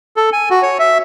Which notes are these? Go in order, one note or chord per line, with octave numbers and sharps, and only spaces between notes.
A4
G#5
F#4
C#5
E5